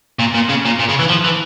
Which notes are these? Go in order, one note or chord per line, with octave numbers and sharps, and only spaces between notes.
A#2
A#2
C#3
A#2
A#2
C#3
E3
F3
E3